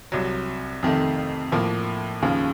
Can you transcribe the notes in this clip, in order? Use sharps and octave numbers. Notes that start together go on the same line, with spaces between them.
C2 C3 F#3
F2 C3 D#3 A3
A2 F3 A#3
D#2 C#3 F3